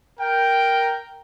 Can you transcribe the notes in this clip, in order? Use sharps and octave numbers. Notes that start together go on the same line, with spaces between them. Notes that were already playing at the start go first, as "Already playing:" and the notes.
A#4 G5